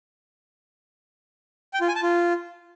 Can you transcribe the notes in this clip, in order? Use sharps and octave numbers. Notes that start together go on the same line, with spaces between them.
G5
F4
G#5
A5
F4